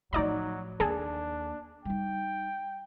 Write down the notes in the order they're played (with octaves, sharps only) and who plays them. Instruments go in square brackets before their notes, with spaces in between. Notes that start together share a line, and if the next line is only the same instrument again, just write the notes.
[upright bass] A2 F3 [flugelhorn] F#3 [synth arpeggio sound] D#4 D5 A#5
[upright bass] D#2 A#3 [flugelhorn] D4 [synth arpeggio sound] G#4 A4
[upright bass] G3 D#4 [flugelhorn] G5